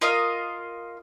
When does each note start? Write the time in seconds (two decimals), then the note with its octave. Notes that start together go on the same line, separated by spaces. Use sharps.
0.01 F4 A#4 D#5 F5